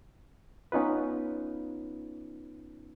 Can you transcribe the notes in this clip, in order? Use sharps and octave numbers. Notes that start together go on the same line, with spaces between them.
B3 C#4 D#4 F4 B4